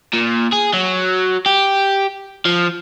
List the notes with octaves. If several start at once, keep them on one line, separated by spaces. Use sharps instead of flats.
A#2
G#4
F#3
G4
F3